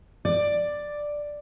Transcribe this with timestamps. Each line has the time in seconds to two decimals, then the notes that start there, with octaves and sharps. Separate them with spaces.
0.25 D5